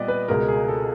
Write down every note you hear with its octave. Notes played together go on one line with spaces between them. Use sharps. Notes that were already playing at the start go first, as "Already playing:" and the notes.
Already playing: A#2 G3 B3 D5 D#5
B4
C#2 B2 G#3 A#4
G#4
A4